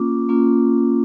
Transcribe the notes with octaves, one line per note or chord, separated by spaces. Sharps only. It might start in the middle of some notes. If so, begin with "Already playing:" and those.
Already playing: A#3 C#4 F4 D6
A#3 C#4 F4